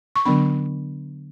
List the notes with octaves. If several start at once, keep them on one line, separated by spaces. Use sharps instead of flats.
C#6
D3 F#3 B3 D4 B5